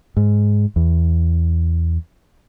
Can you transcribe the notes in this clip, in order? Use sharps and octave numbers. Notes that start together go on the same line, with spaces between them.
G#2
E2